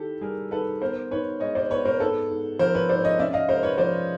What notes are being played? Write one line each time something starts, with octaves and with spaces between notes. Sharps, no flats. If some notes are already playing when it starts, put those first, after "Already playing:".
Already playing: D#3 E4 G4 A4
G3 G#4 A#4
D#3 A4 B4
B3 A#4 C5
D#4 B4 C#5
G#3 C#5 D#5
C5 D5
B3 B4 C#5
A#4 C5
G#2 A4 B4
G#2
F3 A#4 C5
B4 C#5
G#2 C5 D5
C#5 D#5
C#4 D5 E5
D#5 F5
G#3 A#4 C5
B4 C#5
F3 C5 D5